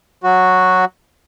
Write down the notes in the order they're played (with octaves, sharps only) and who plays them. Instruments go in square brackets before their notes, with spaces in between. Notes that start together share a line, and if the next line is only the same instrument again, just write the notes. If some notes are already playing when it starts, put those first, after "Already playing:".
[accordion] F#3 F#4